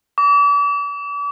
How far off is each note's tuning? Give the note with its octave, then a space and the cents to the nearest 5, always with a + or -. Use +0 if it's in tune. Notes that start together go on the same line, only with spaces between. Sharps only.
D6 -40